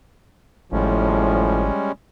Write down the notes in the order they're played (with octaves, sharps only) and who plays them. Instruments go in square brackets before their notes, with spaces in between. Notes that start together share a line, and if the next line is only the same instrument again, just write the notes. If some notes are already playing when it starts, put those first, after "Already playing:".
[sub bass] G#1 [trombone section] A2 F3 [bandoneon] G3 G#3 C#4